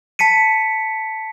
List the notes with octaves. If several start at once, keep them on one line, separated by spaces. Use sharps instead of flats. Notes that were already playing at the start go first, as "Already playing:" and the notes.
A5 B6 C#7 D#7